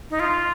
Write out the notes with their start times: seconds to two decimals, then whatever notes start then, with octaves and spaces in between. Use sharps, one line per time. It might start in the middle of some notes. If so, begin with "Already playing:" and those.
0.10 D#4
0.20 F4